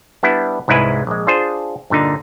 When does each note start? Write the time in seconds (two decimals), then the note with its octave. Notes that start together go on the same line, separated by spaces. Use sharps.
0.23 G3 B3 D4 E4
0.68 C2 G#2 G#3 E4 B4 G#5
1.07 A#1 G#3
1.27 D4 F4 G#4 C5
1.90 G2 A#2 D3 D#4